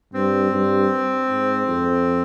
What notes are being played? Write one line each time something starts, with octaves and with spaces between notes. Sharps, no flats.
G2 C4
G2
G#2
F2